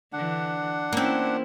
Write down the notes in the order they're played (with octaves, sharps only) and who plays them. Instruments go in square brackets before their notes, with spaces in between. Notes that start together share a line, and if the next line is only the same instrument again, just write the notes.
[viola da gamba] D3 E3 [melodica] D4 F#5
[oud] A#3 C4 [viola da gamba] C#4 E4